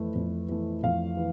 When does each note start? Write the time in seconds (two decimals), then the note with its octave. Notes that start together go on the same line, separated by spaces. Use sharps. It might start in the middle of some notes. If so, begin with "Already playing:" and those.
Already playing: F2 E3 A3 B4
0.15 F2
0.49 E3 A3
0.84 F2 F5
1.17 E3